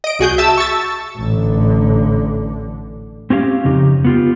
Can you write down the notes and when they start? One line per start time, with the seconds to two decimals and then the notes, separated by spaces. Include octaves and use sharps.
0.04 D#5 D7
0.19 C2 F#4 G#4 G6
0.38 E5 A5 E6 E7
0.58 C#6 E6 A6
1.17 A1 D3
3.30 C4 C#4 G4 F5
3.64 F2 C#3 D#4 G4
4.05 B3 F4 G4